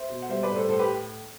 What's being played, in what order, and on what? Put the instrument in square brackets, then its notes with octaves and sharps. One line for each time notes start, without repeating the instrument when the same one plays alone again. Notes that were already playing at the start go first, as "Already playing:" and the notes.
Already playing: [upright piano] C5 E5
B2
F#5
G3 C5 E5
B4 D5
A2
A4 C5
A2 A4 C5
G4 B4